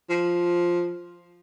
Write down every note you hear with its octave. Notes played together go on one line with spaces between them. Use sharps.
F3